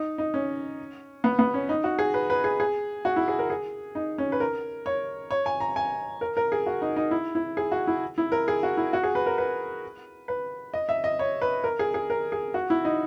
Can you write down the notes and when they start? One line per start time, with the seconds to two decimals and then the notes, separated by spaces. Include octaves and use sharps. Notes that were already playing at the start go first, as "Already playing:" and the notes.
Already playing: D#4
0.18 D#4
0.34 C#4
1.24 B3
1.39 B3
1.54 C#4
1.69 D#4
1.84 F#4
1.99 G#4
2.14 B4
2.30 B4
2.44 G#4
2.60 G#4
3.05 F#4
3.16 E4
3.28 G#4
3.39 A#4
3.50 G#4
3.95 D#4
4.18 C#4
4.32 B4
4.40 A#4
4.86 C#5
5.31 C#5
5.46 G#5
5.60 A#5
5.76 G#5
6.21 A#4
6.37 A#4
6.52 G#4
6.66 F#4
6.82 D#4
6.96 D#4
7.11 E4
7.35 E4
7.57 G#4
7.72 F#4
7.87 E4
8.18 E4
8.32 A#4
8.48 G#4
8.63 F#4
8.77 E4
8.93 F#4
9.03 G#4
9.15 B4
9.26 A#4
9.38 B4
10.28 B4
10.74 D#5
10.89 E5
11.04 D#5
11.19 C#5
11.42 B4
11.64 A#4
11.79 G#4
11.94 G#4
12.10 A#4
12.32 G#4
12.54 F#4
12.70 E4
12.85 D#4